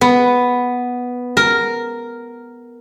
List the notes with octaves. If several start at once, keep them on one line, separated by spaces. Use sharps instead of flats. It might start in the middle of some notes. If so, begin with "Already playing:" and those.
B3
A#4